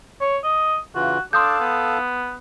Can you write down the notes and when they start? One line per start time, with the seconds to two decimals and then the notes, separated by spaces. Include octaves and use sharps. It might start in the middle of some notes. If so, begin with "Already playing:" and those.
0.21 C#5
0.44 D#5
0.95 C#3 E3 F4 F#4
1.33 D4 A4 F5 A5 C6 D#6 G6
1.60 B3